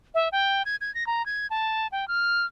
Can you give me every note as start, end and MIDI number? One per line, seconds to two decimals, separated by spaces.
0.15 0.29 76
0.32 0.63 79
0.65 0.76 92
0.81 0.93 92
0.95 1.06 94
1.07 1.24 82
1.26 1.47 92
1.50 1.87 81
1.92 2.08 79
2.08 2.46 89